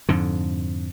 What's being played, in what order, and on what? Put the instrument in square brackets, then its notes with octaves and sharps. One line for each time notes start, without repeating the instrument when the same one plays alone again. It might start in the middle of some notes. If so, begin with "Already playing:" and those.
[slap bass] F2 G#2 D3